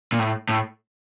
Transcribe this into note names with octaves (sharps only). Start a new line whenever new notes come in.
A#2
A2
A2